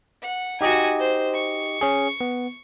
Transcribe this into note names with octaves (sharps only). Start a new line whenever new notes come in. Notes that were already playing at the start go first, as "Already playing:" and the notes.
F#5
D#4 F#4 G4 D#5 G#5
C5
C#6
C#4 G#4
B3